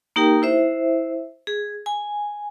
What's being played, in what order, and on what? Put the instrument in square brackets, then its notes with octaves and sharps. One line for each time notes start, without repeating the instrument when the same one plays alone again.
[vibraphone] A#3 D#4 G4 A#4 G5
E4 C5 E5
G#4
G#5